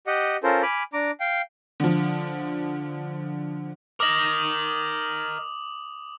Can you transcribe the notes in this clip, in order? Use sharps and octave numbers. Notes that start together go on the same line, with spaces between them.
G4 D#5 F#5
C#4 F4 A4 A#4 C5
G#5 B5 D6 F6
D4 A#5 D6
F5 G5
D3 F3
A#4 D#5 D6 D#6 F#7